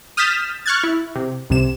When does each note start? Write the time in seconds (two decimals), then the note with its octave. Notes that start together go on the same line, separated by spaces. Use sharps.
0.17 D#6 F6 G6 A6 B6 E7
0.66 C#6 F6 F#6 G#6 A6
0.83 E4
1.15 C3
1.50 C2 C3 E7